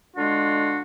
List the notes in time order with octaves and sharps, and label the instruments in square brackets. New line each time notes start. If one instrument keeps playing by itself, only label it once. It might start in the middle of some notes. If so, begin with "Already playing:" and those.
[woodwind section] D3 G#3 D4 F4 F#4